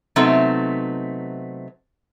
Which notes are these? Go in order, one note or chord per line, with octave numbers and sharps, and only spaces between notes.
C3 F#3 A3 B3 C4 D#4